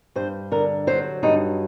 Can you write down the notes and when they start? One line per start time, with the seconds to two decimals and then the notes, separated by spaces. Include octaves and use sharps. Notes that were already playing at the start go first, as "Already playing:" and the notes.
0.16 G2 C5
0.52 D3 A#4
0.87 F#3 C5
1.23 G2 D#4